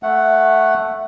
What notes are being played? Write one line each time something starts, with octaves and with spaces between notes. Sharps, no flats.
A3 F#5